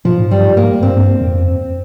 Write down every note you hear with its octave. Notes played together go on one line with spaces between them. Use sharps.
A#2 F3
G#2
G2 G3
G#2
A#3
G2 C4
F2